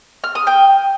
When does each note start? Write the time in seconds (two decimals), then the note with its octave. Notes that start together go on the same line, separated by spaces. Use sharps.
0.24 F6
0.35 D#6
0.47 G5